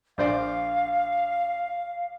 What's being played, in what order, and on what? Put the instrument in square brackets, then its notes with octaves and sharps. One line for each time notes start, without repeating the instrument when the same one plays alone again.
[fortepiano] A#1 C5 D5 [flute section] F5